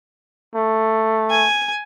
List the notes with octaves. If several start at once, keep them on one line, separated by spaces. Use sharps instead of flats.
A3
G#5